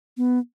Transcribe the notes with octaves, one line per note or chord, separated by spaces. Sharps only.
B3